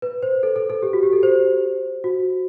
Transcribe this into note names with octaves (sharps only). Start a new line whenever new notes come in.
B4
C5
A4
A4
A4
G4
F#4
G4
A4
C5
F#4